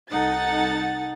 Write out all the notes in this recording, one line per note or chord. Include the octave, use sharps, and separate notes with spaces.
C2 D#4 A4 F#5 A6